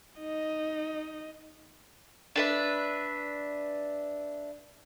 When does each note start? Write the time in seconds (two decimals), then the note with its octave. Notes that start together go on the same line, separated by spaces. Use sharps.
0.19 D#4 D#5
2.36 D4 B4 E5